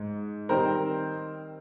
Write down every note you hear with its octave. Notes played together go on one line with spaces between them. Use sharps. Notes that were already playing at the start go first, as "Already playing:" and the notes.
Already playing: G#2
D#3 G3 C4 D#4 A#4 C5